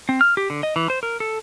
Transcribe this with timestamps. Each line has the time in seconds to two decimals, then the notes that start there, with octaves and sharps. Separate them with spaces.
0.09 C4
0.21 F6
0.37 G4
0.50 D3
0.63 D#5
0.76 E3
0.90 C5
1.03 A#4
1.20 A4